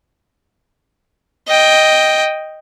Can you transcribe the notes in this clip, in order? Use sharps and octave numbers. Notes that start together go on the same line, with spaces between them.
D#5 G5